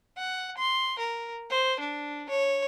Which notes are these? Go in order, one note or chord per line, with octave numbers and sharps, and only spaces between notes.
F#5
C6
A#4
C5
D4
C#5